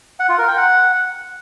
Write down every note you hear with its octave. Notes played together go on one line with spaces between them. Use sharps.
F#5
F4
A#4
G5
F#5